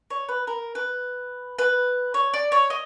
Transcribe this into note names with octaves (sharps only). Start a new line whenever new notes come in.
C#5
B4
A#4
B4
B4
C#5
D5
C#5
D#5